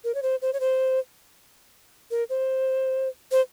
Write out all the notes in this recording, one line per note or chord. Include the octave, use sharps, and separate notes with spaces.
A#4
C#5
C5
C5
C#5
C5
A#4
C5
C5